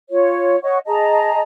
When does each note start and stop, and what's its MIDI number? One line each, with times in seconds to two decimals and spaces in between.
0.10 0.57 65
0.10 0.57 73
0.63 0.79 73
0.63 0.79 75
0.63 0.79 78
0.63 0.79 85
0.87 1.42 68
0.87 1.42 75
0.87 1.42 81
0.87 1.42 82